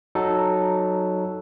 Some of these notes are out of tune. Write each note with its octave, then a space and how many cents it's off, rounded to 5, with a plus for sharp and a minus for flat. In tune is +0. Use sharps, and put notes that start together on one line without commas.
F#3 +0 D#4 -10 A4 +0